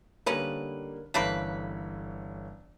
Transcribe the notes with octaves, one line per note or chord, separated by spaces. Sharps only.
D3 G3 A#3 C#4 D#4 B4
G1 E3 A3 A#3 C#4 B4